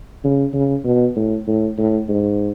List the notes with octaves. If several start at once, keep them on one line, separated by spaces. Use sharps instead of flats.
C#3
C#3
B2
A2
A2
A2
G#2